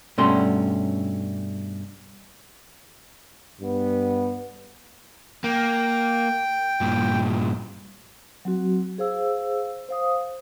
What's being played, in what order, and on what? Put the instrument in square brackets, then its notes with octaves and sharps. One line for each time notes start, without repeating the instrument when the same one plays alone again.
[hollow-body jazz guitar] G2 B2 A3 C#4 C6
[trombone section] G2 B3
[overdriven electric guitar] A#3 [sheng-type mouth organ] G5
[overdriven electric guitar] G2 A#2
[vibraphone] F#3 C4 F#4
G#4 C5 F5 E6
C5 F5 D#6